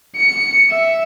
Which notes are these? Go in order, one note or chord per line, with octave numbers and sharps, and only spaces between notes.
C#7
E5